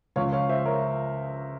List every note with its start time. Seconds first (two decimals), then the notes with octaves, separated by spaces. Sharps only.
0.16 C#2 C#3 F3 C#5 F5
0.32 C#5 F5
0.49 C5 E5
0.65 A#4 C#5